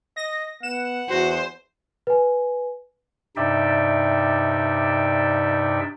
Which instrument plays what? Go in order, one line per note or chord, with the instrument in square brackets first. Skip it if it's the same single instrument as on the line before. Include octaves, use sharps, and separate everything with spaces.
[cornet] D#5 [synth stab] A#6
[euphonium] B3 [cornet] F#5 [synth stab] E7
[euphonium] E2 [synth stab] F#4 [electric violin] C5
[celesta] B4 G#5
[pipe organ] G2 C3 D#4 D5 E5 G5